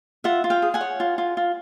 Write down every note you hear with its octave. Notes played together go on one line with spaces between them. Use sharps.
F4 E5 F#5
F4
F5 G5
G#4
F#5 G#5
C#5
F4
F4
F4